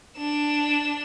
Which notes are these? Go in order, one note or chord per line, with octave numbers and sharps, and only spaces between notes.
D4 E7